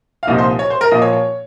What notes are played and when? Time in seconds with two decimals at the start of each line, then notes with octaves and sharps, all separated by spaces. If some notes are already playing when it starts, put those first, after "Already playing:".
0.23 F5
0.27 C2 A#2 F3 A#3 D#4 D#5
0.38 C5
0.59 C#5
0.70 C5
0.81 A#4
0.92 A#2 F3 A#3 D#5
1.02 C#5
1.13 C#5